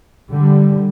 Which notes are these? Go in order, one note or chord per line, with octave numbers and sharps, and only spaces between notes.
D3 G3